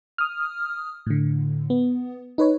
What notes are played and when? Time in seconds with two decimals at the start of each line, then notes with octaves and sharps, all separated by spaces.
0.18 D#6 F6
1.06 A2 D3
1.70 B3
2.38 D#4 B4 C#5